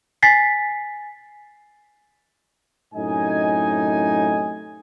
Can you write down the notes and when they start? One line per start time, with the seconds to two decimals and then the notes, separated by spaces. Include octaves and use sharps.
0.23 G#5 A6 B6 C7
2.94 F#2 A2 C3 D#4 D#5 G#5